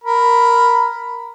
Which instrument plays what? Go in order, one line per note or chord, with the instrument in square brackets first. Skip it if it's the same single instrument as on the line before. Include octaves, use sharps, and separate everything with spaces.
[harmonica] A#4 B5